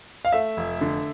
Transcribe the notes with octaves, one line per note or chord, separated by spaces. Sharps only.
F5
A3 E5
F1
D3